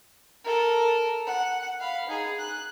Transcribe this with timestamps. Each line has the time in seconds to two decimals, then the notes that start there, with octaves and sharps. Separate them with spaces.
0.45 A4 A#4
1.27 F#5
1.80 F5 B5
2.09 D#4 G#4
2.39 F#6